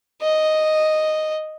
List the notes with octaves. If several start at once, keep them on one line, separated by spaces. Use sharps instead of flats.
D#5